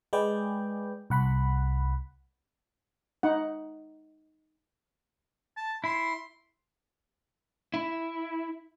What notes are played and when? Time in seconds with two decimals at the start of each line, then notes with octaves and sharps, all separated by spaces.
0.13 G#3 G#4 B4 D5 G5
1.10 C2 F#5 B5
3.23 D#4 F#5
5.57 A5
5.84 E4 C6
7.74 E4